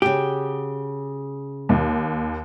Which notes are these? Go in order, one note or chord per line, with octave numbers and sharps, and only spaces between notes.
C#3 F#4 G4
D#2